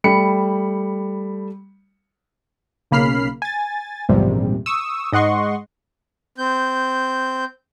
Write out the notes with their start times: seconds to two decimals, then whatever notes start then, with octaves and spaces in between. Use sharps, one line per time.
0.04 G3 A3 B5 C#7
2.91 B1 C#3 A#3 B5 F6 C7
3.42 G#5 A6
4.09 A#1 E2 G#2 C3 G3
4.66 C#6 D#6 E6
5.12 G#2 D#5 F#5 C6 C#6
6.38 C4 G6